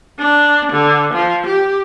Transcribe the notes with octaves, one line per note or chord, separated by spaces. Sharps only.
D4
D3
F3
G4